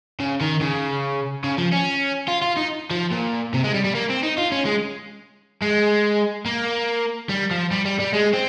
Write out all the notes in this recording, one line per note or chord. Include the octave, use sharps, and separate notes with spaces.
C#3
D#3
C#3
C#3
F3
C#4
F4
F4
D#4
F3
A#2
C3
G#3
G3
G3
A#3
C4
D#4
F4
C#4
G#3
G#3
A#3
G3
F3
G3
G3
G3
G#3
C4